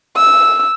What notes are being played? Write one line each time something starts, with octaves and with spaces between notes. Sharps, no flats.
E6